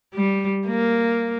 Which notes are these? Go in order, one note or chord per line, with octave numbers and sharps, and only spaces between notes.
G3
A#3